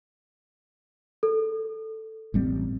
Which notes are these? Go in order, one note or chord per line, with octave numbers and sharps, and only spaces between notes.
A4
A1 G3 C4